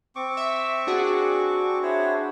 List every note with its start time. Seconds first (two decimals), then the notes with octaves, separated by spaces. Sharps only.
0.15 C4 C#6 D6
0.37 E5
0.87 D4 F#4 G#4
1.83 E4 C5 C#5